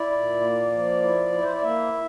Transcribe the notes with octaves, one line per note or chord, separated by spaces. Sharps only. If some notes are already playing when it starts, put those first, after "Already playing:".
Already playing: E4 D5
A#2
A#3
F3
E4
E4
C5
D5
A#3 E5